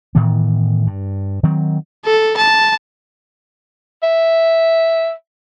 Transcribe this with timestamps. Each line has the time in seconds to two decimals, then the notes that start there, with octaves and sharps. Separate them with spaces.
0.15 A2 D#3 E3 B3
0.87 G2
1.43 D#3 F#3 C4
2.05 A4
2.37 A5
4.03 E5